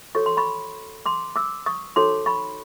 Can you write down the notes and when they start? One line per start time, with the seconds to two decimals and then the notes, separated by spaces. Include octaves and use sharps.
0.15 F#4 A4 C#5 C#6
0.26 C6
0.37 B5 C#6
1.06 C6 D6
1.36 D6 E6
1.66 C#6 D#6
1.96 D#4 F#4 A4 C#5 C6 D6
2.26 B5 C#6